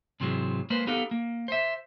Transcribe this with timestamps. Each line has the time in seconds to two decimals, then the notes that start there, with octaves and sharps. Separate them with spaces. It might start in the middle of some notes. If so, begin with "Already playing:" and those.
0.20 G#2 C3 E3 F#3 G#3
0.70 G#3 A#3 B4 C5
0.87 B3 D#4 G4 A4 F5
1.11 A#3
1.48 C5 E5